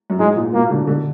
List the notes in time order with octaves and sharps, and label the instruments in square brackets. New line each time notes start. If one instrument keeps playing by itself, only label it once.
[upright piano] F#2
[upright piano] G#2 [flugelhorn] G#3
[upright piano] A#2
[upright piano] B2 [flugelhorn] A#3
[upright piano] D3
D3